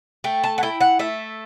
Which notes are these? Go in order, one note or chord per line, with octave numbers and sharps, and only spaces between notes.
A3 G5
A5
F#5
E4 G5
F#5
A3 E5